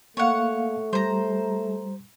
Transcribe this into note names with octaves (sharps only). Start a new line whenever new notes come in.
A3 A#3 C#5 F5 F#5
G3 C5 A#5